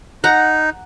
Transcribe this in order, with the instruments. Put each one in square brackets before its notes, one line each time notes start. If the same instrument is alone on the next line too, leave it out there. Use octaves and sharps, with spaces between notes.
[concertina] D#4 [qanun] F#5 A#5